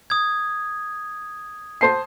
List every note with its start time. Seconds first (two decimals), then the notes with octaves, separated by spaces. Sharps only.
0.10 D#6 G#6
1.81 C5 A5 C7